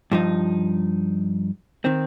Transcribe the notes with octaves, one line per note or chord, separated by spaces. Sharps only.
G2 F3 D#4
D#3 C4